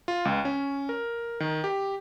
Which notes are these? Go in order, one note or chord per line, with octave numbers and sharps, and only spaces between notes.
F4
C#2
C#4
A#4
D#3
G4